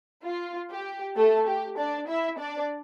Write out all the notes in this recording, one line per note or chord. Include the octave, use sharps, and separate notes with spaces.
F4
G4
A3 A4
G4
D4 D5
E4 E5
D4 D5